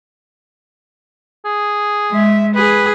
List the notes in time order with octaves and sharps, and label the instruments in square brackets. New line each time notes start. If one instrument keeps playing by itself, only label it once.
[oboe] G#4
[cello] G#3 E5
[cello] G#4 [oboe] B4